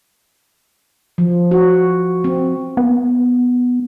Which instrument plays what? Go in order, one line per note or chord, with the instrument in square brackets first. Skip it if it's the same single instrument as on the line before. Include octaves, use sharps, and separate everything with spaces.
[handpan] F3
F#4
C4
[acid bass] B3